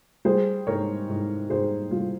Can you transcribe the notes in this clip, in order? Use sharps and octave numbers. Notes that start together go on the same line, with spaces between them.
G3 G#4 C5
G#2 A#4 C#5
G#2
G#2 G#4 C5
G3 F4